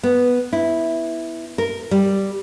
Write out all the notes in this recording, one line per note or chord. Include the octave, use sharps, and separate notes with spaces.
B3
E4
A#4
G3